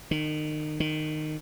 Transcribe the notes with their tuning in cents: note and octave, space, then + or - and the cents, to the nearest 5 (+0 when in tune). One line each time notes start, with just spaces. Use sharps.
D#3 -30
D#3 -15